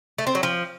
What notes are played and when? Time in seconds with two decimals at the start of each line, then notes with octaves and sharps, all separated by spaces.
0.18 A3
0.27 C4
0.35 F#3
0.43 F3